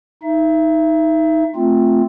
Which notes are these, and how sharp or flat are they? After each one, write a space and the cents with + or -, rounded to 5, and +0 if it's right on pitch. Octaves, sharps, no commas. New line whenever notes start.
D#4 +15 E5 +25
A3 +0 C4 +0 F4 +0